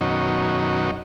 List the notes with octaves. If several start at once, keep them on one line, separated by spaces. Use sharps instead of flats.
F#2 B2 D#3 F#3 C#4 D#4